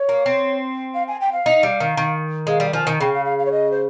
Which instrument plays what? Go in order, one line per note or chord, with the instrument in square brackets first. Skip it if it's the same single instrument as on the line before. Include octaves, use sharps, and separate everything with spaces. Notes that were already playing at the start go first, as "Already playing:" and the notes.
Already playing: [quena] C#5
[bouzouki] A#3
C4
[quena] F5
G#5
G5
F5
[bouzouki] D#4
G3
D#3
D#3
[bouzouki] G#3 [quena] F5
[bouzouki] G3
[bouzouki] F3 [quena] G#5
[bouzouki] D#3
[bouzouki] C#3 [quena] G5
[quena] F5
F5
F5
C#5
D#5
C5